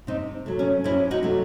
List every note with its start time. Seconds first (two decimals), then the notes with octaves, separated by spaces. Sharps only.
0.07 C3 C4 D#4
0.46 F#3 A3
0.59 C#4
0.84 C3 C#4 E4
1.11 D#4 F#4
1.23 F#3 A3